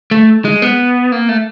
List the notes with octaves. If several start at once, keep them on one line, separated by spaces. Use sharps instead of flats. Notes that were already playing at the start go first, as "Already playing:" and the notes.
A3
G#3
B3
A#3
A3